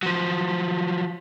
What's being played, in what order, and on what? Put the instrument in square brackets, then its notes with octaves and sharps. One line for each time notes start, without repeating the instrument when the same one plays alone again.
[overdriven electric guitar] F3 F#3